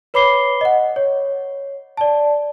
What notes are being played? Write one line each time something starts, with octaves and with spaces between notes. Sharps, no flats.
B4 C#5 B5 D6 C7 G7
D#5 F#5
C#5
D5 A5